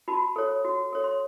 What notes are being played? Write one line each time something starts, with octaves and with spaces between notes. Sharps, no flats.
F#4 A5 B5
A4 C#5
F#4
A4 C#5
C6